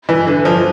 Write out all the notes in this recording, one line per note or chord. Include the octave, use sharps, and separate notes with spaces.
E3
D3
F3